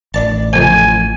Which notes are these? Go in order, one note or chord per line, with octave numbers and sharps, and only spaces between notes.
A1 D4 D5 A5
F2 C3 G#5